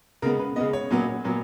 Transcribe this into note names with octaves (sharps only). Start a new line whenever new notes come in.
C#3 G#3 B3 A#4
B4
C#3 G#3 B3 D#5
C#5
A#2 F#3 B3
A#2 F#3 B3